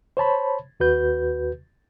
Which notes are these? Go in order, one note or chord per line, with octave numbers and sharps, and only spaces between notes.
C5 C#5 A5 B5
D#2 F#4 B4 G6